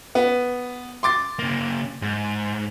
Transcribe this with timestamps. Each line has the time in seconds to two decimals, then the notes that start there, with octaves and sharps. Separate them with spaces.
0.15 B3
1.03 C6 D6 A6
1.39 C#3 A#3
2.02 G#2